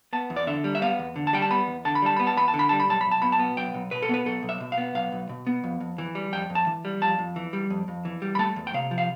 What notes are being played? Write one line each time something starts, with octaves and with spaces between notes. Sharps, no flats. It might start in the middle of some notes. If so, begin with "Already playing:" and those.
B3 A5
E2
D5
D3 E5
G3
E5
B3 F5
E2
D3
A5
G3 G5
A5
B3 B5
E2
D3 A5
B5
G3 A5
B3 B5
A5
E2 B5
A5
D3
B5
G3 A5
B5
B1 A5
B1 B5
A5
B2 B5
A5
B3
B1 G5
B1
B2 B4
A4
B3 B4
B1 A4
B1
E5
B2
F5
B3
B1 F5
B1
B2
B3
F2
F2
E3
G3
F2 G5
F2
A5
E3
G3
F2 A5
F2
E3
G3
F2
F2
E3
G3
B5
A3 A5
E2
G5
C3 F5
F3
F5